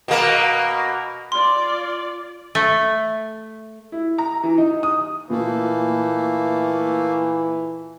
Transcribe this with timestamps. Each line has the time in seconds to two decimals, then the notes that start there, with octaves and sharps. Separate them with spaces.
0.08 B2 A#3
1.32 F4 D5 C6
2.55 A3
3.92 E4
4.18 A#5
4.43 E3
4.58 D#4
4.83 D#6
5.30 A#2 E3 A3 A#3